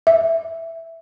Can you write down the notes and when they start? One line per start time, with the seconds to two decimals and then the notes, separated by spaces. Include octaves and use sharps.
0.07 E5